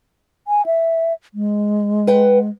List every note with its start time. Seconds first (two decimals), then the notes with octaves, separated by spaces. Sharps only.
0.48 G#5
0.66 E5
1.34 G#3
2.07 B4 F#5 G5